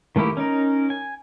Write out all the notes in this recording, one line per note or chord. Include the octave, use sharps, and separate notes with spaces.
D#3 A3 A#3 E4 G4
C#4 D#4 A#4
G#5